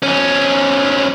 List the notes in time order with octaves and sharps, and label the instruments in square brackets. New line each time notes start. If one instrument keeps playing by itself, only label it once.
[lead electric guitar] F2 C#4